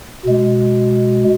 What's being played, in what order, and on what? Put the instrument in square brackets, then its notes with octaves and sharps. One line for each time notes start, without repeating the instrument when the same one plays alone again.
[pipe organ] B2 G#3